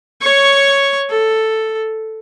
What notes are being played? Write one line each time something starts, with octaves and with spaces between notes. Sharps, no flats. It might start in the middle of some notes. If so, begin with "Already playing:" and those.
C#5 C#6
A4